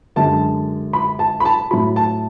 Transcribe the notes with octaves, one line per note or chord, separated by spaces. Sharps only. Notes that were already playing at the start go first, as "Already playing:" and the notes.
F#2 D3 G#3 A5
B5
A5
B5
A5
A2 F#3 B5
A5